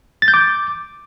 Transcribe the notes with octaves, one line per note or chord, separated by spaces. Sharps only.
A6
G6
D6